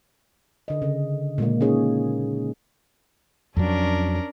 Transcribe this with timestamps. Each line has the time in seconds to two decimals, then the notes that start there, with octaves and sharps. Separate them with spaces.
0.68 D3 D#5
0.82 C#3
1.38 A#2 G#3 A#3
1.61 C#4 D#4 G#4 C#5
3.57 F2 F#3 C#4 D4 A#4